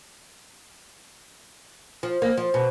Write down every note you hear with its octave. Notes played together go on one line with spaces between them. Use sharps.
F3
A#3
F3
B2